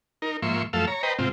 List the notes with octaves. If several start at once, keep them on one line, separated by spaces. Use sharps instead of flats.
D#4 A#4
G#2 F3 A#3 E5 C6 C#6
F#2 F3 A3 A4 F5 E6
C#5 A#5
B4 C5 D#5 G5 A#5
G#2 C3 C4 F4